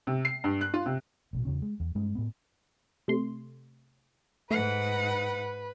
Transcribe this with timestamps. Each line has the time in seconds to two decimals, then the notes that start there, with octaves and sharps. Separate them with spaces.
0.07 C3
0.25 C7
0.44 G2
0.61 F#6
0.74 F4
0.86 C3
1.33 A1 B2
1.45 E2 C#3 C#4
1.62 G#3
1.80 E2
1.95 G2 G#3 C#4
2.15 A2 B3
3.08 C3 A3 C6
4.51 G#2 A3 B4 F#5